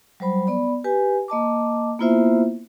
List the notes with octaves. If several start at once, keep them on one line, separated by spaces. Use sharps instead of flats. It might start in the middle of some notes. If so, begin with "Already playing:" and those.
F#3 G3 C5 B5
B3 D5 B5
G4 B4 G#5
A#3 D#5 A5 D6
A#3 B3 E4 F4 C5 E5